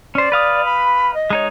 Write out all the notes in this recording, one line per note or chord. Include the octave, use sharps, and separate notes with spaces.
C#4 C5 D5
B4 F5 D#6
B5
D#5
G#3 D#4 C#5